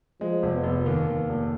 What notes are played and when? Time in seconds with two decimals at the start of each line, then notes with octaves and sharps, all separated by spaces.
0.21 F3 G#3
0.43 F1
0.54 B3
0.63 F1
0.85 D#2 A#3
1.08 D#2
1.29 F1